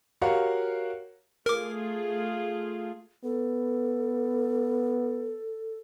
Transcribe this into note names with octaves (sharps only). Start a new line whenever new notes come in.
F#4 G4 A#4 C#5 F5 F#5
A3 F4 G#4 A#4 D6
B3 A4